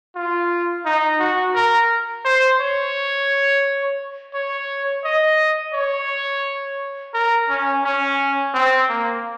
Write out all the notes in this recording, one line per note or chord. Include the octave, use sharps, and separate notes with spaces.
F4
D#4
F#4
A#4
C5
C#5
C#5
D#5
C#5
A#4
C#4
C#4
C4
A#3